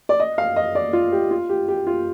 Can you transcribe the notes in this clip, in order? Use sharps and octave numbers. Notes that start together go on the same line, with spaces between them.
D5
D#5
F5
D#5
D5
F4
G4
F4
G4
G4
F4